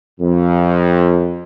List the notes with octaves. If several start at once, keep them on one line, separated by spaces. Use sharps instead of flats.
F2